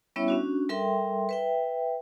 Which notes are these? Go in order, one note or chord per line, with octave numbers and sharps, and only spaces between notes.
G3 B3 C#4 E4 C#5 E5
C#4 D4 F#4
G3 A4 A#4 E5 G5 C6
B4 E5 G5